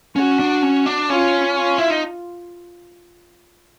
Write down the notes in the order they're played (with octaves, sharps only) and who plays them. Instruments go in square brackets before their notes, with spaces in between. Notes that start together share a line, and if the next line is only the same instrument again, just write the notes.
[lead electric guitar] C#4 [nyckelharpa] F#4
[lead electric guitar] D4
C#4
D4
[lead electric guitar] C#4 [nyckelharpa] F4
[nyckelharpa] F4
[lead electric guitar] E4
D#4